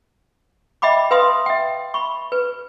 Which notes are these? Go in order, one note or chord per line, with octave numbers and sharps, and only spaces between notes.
D#5 E5 G5 B5 D6
B4 F5 C6 D#6
E5 G5
B5 C#6
B4